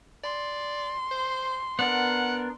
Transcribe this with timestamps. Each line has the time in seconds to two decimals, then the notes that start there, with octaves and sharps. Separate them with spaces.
0.24 D5 C6
1.11 C5
1.79 B3 D4 A#4 F#5